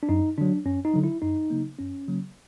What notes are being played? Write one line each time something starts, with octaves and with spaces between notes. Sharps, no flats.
D4
F#2 D#4
D3 F#3 D4
F#2 C#4
D#4
D3 F#3
E4
F#2 D#4
C#3 F#3 A#3
F#2 C#4
C#3 F#3 A#3